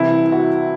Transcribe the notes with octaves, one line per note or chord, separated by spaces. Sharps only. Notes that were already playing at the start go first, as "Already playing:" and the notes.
Already playing: C2 C3 E3 E4
F#4